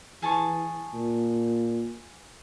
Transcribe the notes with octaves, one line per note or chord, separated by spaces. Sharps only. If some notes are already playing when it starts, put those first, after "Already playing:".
E3 G#4 A5 C#6
A#2